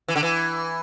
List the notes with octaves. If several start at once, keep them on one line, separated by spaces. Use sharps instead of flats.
E3
D3
E3